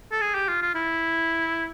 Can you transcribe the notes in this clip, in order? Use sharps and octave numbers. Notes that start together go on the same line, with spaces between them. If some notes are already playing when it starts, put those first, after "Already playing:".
A4
G#4
G4
F4
F4
E4